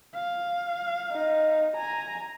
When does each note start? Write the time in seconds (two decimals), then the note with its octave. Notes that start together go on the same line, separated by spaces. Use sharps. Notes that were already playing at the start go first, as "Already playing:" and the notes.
0.15 F5
1.12 D#4
1.76 G#5 A#5